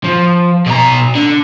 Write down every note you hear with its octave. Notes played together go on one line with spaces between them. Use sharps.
F3
B2 A#5
D3